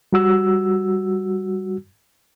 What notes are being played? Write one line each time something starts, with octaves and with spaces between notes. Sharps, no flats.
G3 F#4 E6